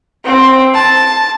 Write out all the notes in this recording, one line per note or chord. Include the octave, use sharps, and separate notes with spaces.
C4
A5